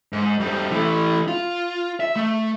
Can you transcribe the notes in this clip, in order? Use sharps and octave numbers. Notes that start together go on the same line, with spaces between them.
G#2
F2 G3
E3 A3
F4
E5
A3